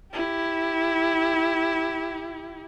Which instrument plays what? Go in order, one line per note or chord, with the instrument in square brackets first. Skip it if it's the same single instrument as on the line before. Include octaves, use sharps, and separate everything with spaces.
[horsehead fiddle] E4 G4